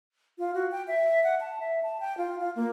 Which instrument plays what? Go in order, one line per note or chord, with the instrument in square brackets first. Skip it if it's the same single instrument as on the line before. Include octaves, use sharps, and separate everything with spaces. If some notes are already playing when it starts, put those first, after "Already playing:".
[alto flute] F4
F#4
G5
E5
F#5
A5
E5
A5
G5
F4
F4
A#3